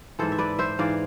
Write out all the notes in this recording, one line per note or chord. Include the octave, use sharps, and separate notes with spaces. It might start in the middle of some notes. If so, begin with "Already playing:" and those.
G#2 E3 A4 C5
E5
B4 D5
C5 E5
G#2 E3 D5 F5